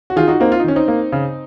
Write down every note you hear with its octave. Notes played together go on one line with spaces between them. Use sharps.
F#4
D#3 F4 G#4
D#4 F#4
A#3 C4 D#4
F4
D#4
D#3 C#4
C4 D#4
A#3
C#3